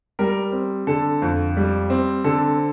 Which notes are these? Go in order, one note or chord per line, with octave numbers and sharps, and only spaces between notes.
G3 A#4
C4
D3 A4
F2
G3
C4
D3 A4